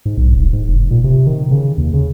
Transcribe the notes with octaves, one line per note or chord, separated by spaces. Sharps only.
G#2
B1
D#1
G#2
F1
A#2
C3
D#3
C#3
D#2
C#3